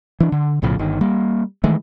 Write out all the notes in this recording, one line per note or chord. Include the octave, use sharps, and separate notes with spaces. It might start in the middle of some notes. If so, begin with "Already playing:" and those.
E3 D4
D3
B1 A2 C#3 F3
G1 D#3
G3 A#3
D#3 E3 G#3 A3